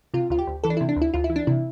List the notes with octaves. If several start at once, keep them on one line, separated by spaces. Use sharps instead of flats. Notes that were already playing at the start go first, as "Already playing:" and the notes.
C3 F4
D2 F4
G4
D2
E3 A4
D4
E4
C3
D4
D2
E4
D2 F4
E4
E3
D4
C3 E4